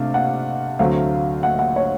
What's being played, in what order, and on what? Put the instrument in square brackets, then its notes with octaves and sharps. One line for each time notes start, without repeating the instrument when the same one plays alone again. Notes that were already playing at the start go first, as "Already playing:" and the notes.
Already playing: [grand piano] C3 A3 D4 [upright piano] F5
[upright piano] F#5
[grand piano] D2 D3 F#3 A3 C4 [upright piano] F5
[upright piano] F#5
F#5
C#5